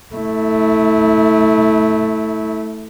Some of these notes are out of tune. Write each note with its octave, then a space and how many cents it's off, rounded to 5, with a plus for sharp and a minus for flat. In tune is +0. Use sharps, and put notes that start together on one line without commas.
A3 +0 E4 -30